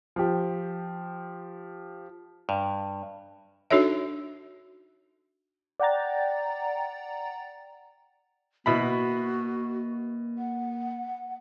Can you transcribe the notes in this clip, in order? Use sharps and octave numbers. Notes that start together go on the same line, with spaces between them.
F3 G4
G2
D4 D#4 F#4 A4 C#5 E5
D5 F#5 G5 A#5 A6
B2 A#3 E4 F#4 B5
F#5